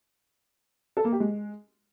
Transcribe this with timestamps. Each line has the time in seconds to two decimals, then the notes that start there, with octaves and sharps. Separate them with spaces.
0.97 A4
1.05 A#3
1.12 G4
1.20 G#3